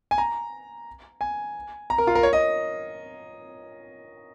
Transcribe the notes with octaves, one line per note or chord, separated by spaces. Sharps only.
G#5
A#5
G#5
A#5
A#4
F4
A#4
C#5
D#5